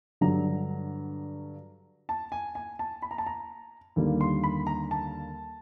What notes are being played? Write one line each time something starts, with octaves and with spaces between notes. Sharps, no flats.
G2 D3 F#3 A#5
A5
G#5
G#5
A5
B5
A#5
A5
A#5
D#2 D3 G3 A#3
C6
B5
A#5
A5